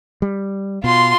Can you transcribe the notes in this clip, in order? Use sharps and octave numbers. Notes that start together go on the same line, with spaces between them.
G3
B2 F4 C6